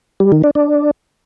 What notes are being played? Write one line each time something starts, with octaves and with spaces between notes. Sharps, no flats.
G3
D#3
D4
D4